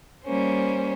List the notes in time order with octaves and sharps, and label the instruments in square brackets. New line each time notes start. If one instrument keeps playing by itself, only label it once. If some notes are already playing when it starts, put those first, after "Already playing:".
[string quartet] G3 A#3 C#4 C5